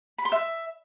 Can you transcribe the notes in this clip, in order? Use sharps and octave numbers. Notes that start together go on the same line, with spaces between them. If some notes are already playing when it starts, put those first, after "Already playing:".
B5
C6
E5